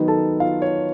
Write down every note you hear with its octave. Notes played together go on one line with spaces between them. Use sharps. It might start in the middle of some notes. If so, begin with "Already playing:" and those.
Already playing: D#3 F#3 B3 D#4
A4 A5
F4 F5
C#5